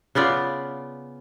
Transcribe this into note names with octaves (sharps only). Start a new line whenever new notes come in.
C#3 B3 F4 D5